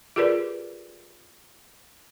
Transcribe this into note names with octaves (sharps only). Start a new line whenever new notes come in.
F4 G4 G#4 A#4 B4 D5